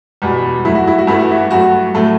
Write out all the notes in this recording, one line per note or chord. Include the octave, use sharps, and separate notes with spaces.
E2 B2 G3
G2 F#3 A3 E4
F#4
E4
F#4
G2 E3 A3 E4
F#4
E4
G2 F#3 A3 F#4
A2 F#3 A3 A4